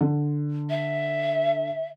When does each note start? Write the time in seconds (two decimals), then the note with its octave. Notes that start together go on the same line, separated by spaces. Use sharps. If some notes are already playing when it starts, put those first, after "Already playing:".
0.01 D3
0.70 E5